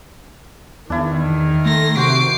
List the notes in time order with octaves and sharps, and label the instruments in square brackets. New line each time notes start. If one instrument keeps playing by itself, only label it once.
[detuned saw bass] E2 [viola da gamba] D#3 [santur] D4 E4
[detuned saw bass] E2
[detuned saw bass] A3 [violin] C6 A#6
[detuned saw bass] C3 [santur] F#4 C5 [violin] D6 C7